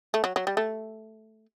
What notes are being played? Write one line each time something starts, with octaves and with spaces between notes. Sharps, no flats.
A3
F#3
F#3
G3
A3